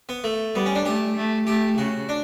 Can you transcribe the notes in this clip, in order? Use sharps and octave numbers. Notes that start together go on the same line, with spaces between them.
B3
A3
G3 B3
C#4
D4
A3 G4
A3
A3 G4
C#3 F#4
D4